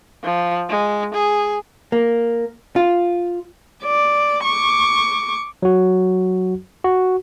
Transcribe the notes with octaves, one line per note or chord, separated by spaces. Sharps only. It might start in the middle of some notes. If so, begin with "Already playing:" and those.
F3
G#3
G#4
A#3
F4
D5
C#6 D6
F#3 F#4
F#4